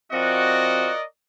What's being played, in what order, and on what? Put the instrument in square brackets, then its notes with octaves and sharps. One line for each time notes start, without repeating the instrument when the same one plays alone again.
[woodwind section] F3 C4 F#4 [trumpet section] A#4 D5 D#5